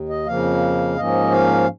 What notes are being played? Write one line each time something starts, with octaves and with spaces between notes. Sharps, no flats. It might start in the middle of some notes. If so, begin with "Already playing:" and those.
Already playing: D#2
D#5
F2 C#3 F3 A#3 F5
G#2 F3 A#3 C#4 D#5
F5